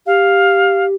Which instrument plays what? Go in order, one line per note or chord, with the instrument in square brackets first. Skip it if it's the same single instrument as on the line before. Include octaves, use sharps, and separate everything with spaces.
[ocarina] G4 [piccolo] F5